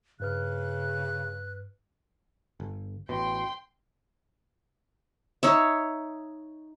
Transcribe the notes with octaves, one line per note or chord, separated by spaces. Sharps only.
G2 C#3 B4 F6 F#6
G1
A1 B2 G5 C6
D#4 C#5 E5